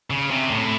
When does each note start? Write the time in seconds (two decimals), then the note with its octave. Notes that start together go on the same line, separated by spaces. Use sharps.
0.10 C#3
0.31 C3
0.50 A2